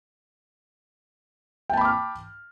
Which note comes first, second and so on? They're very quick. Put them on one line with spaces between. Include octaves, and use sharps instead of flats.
G5 A5 B5 D6 F6